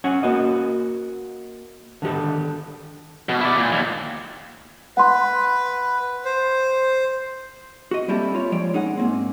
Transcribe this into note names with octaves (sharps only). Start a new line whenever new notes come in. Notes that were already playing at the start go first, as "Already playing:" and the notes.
C#4 F#5 G#5
A#3 F#4 D#5
D3 D#3 G4 A4
B2
E4 D5
A#2
D#2
B4 F#5 C6
C5
F#4 D#5
G3 A#3 C4 E4 G4 A4
F4 C#5
F3 G#3 C#5 D5
C#4 D#4 G#4 F#5
G#2 A#3 C4